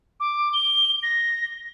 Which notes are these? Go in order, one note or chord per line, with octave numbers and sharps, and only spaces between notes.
D6
G7
A#6